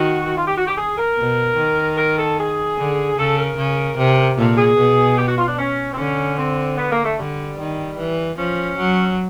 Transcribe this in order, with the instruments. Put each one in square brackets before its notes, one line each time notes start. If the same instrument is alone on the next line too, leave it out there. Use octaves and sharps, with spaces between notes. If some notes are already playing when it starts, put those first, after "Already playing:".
Already playing: [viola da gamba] D#3 [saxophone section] F#4
[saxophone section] F4
G4
F#4
G4
G#4
A#4
[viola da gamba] B2
D#3
[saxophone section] A#4
A4
G#4
[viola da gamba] D3
[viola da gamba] C#3 [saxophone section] A4
[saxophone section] A#4
[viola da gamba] C#3
C3
[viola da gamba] A#2 [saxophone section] A4
[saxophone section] G#4
[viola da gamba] B2
[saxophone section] G4
F#4
F4
D4
C#4
C4
[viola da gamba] D3 [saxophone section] C#4
[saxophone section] C4
B3
A#3
A3
[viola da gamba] D3 [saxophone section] G3
[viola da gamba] D#3
E3
[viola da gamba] F3 [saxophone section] C#4
[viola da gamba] F#3